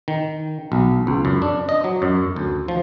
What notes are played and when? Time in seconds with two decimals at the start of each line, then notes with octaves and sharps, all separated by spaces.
0.08 D#3
0.72 B1
1.07 C#2
1.25 F#2
1.42 D4
1.69 D#5
1.84 F#3
2.02 F#2
2.36 D2
2.68 F3